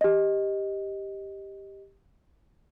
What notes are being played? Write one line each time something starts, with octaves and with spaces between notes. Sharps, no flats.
G4 D#5